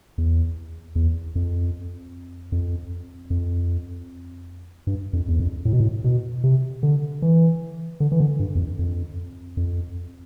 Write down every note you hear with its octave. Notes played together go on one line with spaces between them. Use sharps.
E2
E2
F2
F2
F2
G2
F2
E2
F2
A2
B2
A2
B2
C3
D3
E3
D3
E3
D3
G2
E2
F2
F2
F2